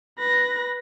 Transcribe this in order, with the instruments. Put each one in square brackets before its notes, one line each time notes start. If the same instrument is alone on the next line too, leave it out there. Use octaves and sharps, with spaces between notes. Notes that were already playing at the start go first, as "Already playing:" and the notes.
[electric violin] B4 A#6